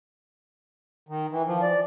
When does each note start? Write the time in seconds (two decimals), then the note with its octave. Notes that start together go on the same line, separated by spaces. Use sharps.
1.09 D#3
1.31 E3
1.46 F3
1.62 D5